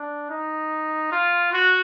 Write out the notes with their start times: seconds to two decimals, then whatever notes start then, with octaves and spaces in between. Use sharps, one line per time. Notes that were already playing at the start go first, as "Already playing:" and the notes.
Already playing: D4
0.30 D#4
1.12 F4
1.52 F#4